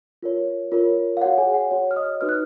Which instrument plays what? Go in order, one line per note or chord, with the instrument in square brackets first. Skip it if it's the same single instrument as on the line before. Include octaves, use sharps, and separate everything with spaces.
[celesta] F4 A#4 C#5
F4 A#4 C#5
F5
F#4 C#5 F#5
G#4 G#5
F#5
F#4 C#5
F6
D#5 D#6
D#4 F#4 B4 F6
F#6